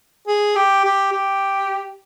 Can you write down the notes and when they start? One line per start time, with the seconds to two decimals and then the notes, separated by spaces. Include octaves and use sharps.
0.28 G#4
0.56 G4
0.84 G4
1.13 G4